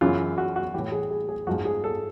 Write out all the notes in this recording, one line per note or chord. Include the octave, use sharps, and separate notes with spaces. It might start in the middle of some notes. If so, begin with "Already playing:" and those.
F#2 C#3 E3 F4
F#4
F#4
A2 E3 G4
G#4
G#4
G#4
G#2 F3 F#4
G#4
A4